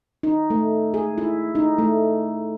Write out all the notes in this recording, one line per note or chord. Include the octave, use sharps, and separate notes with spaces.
D#4
A3
G#4
E4
D#4
A3